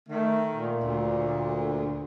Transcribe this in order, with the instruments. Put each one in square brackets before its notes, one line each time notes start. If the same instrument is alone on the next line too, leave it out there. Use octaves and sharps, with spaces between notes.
[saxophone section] D#3 [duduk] A3
[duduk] A#2
[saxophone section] D2